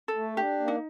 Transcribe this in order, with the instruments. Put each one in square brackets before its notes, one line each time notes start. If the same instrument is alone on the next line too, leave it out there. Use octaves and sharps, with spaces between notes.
[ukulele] A4
[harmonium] A3
[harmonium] D4 [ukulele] G4
[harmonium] A#3
[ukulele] D#4